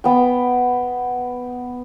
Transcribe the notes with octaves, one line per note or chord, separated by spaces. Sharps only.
B3 G5